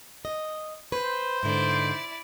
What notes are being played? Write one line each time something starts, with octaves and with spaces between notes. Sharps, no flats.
D#5
B4 C5
G#2 D3 E4 D5